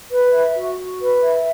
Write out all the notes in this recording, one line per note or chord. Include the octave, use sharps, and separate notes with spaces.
B4
E5
F#4
F#4
B4
E5